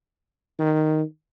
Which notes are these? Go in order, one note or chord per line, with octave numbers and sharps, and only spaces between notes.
D#3